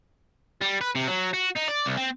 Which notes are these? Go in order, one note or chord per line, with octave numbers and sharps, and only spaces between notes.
G3
B4
C3
F#3
F#4
D#4
D5
C2
C4